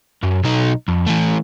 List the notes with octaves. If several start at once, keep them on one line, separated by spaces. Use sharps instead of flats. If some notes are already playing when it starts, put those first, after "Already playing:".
F#2
B1 D#4
F2
E3 A3